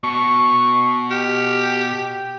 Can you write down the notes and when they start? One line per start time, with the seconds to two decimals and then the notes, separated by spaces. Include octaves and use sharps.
0.03 B2 C#6
1.11 G4 F6
1.96 G5